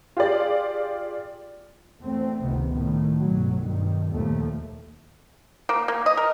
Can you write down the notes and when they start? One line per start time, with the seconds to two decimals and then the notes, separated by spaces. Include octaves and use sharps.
0.17 F4 G4 G#4 D5
2.01 E2 A3 C4
2.42 F1 C#2 C3 D#3 B3
2.71 A2 D#3
3.19 B1 G2 F#3
3.59 G2 D#3
4.12 D#2 A#2 F3 A3 A#3
5.69 A#3
5.88 A#3
6.06 D#5
6.17 A#4